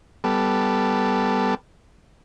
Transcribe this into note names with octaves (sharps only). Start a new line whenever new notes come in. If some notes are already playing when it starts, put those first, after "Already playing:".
G3 B3 A4